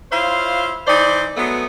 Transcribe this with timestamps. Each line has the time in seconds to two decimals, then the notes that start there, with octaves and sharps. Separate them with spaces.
0.11 E4 F4 C5 C#5 F5
0.87 E3 D#4 C5 D5
1.37 F#3 G#3 A3 B3